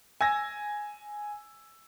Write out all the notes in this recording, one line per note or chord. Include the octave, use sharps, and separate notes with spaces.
G#5 E6 G#6 A#6